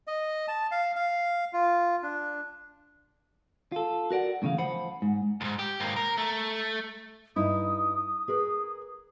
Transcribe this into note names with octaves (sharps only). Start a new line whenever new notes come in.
D#5
A5
F5
F5
F4
D4
F4 A4
F#4 A#4 D5 F#5
F#2 A2 C#3 E3 F5
F3 C5 F#5 B5
G#2
D2 G#2
G4
G#2 A#3
A#4
A3
G2 D#4 E4 D#6
G#4 A#4 B4